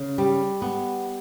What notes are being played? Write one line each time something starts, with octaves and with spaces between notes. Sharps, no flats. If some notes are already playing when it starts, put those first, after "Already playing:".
Already playing: C#3
G3
B3